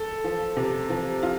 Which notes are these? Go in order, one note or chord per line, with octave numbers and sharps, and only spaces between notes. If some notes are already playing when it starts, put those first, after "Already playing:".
Already playing: A4
F3
C3
F3
F4